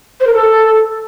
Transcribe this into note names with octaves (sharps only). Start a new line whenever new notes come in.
C5
A#4
A4